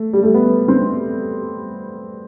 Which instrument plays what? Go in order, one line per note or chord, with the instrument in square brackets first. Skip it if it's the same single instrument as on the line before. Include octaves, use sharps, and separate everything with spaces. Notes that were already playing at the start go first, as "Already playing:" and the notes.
Already playing: [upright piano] A3
G3
A3
B3
C4